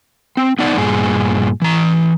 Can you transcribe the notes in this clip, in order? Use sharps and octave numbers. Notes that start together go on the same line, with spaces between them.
C4
B3 D#4 D5 F#5
G2 A#2 G#4
E3 A#5